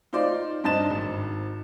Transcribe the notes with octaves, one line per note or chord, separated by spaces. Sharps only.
D#4 F4 C5 D5
G2 C5 D#5 A5 A6 E7
G#1